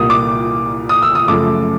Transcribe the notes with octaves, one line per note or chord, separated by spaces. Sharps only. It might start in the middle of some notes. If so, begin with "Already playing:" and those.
Already playing: C2 A#2 G3 A#3 D#6
D6
D#6
E6
D#6
F#2 C#3 F3 A3 D6